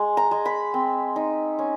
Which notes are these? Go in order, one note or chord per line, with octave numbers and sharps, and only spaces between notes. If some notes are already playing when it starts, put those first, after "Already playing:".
Already playing: G#3
A#5
G#3
B5
C4
D#4
C#4